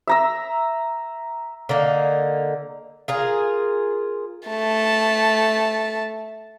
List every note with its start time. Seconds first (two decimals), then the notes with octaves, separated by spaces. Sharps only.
0.07 E5 A#5 E6
1.69 D3 A#3 D#4
3.08 F4 G#4 A#4
4.49 A3 A5